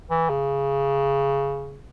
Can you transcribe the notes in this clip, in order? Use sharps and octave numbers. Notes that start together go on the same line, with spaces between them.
E3
C#3